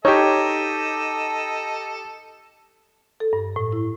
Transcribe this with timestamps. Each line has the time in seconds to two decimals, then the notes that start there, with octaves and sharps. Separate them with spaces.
0.05 D#4 G4 A4 C#5 D#5
3.20 A4
3.33 G2
3.56 A2
3.72 E4